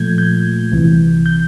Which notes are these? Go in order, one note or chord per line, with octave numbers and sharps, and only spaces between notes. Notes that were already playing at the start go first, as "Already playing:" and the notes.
Already playing: A#2 F3 A3 G6 G#6
G6
C2 C3 E3
G6